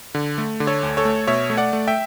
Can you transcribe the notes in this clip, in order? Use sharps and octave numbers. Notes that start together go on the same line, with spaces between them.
D3
A3
D3
A4 C#5
D2
A4 C#5
A3
B2 C#5 E5
A3
D5 F#5
A3
E5 G5